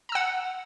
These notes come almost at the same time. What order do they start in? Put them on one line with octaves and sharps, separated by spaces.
A#5 E6 F#5